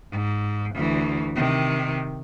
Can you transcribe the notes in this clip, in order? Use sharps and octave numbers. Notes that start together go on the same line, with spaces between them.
G#2
D2 E3
C3 D#3